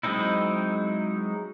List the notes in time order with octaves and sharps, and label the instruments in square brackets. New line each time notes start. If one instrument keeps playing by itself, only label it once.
[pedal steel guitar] F#3 G#3 C4 D#4 E4